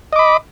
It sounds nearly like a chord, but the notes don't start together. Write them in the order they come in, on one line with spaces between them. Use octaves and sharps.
D#5 D6 B5